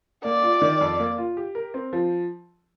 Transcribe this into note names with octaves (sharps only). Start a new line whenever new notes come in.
A#3 D5
F4
D#3
F2
A#3
F4
G4
A#4
C4
F3